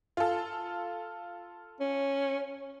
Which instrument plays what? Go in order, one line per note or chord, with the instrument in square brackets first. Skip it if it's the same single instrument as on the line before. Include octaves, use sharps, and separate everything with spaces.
[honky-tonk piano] F4 A4
[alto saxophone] C#4